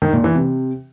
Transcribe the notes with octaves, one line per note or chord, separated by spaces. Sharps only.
D#3
A#2
E3
C3